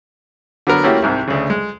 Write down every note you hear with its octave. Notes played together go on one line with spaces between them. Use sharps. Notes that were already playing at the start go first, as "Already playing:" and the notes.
D3 F#3 B3 A#4
A3 A#3 C#4 E4 F#4 G4
C2 G#2 C3
D2 C#3
G#3